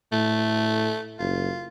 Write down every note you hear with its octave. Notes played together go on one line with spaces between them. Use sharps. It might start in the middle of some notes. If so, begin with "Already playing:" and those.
A2 A3
F#1 F4